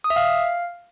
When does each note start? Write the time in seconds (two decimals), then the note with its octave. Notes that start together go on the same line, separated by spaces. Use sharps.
0.04 D#6
0.10 E5
0.16 F5